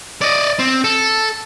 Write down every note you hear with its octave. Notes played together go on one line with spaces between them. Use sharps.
D5 D#5
C4
A4